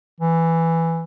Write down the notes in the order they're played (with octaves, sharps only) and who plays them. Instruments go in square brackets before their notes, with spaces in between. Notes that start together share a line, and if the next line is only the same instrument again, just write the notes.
[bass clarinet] E3